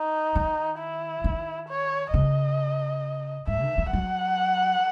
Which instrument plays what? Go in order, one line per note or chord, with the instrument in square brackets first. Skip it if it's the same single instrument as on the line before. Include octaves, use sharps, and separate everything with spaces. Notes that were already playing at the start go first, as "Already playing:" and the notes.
Already playing: [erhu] D#4
[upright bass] D#3
[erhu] E4
[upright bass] D#3
[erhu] C#5
[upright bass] C#3 [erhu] D#5
[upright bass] G#2 [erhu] E5
[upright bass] D#3
E3
[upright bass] F#3 [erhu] F#5